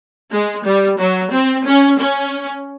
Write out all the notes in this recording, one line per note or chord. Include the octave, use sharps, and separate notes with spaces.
G#3
G3
F#3
C4
C#4
C#4